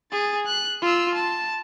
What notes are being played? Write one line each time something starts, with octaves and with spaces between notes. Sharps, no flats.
G#4 A6
F#6
F4 E6
A5